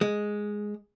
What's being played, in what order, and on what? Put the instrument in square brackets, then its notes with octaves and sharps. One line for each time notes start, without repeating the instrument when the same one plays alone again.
[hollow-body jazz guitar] G#3